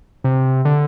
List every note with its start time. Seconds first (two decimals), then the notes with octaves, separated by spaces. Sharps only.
0.24 C3
0.65 D3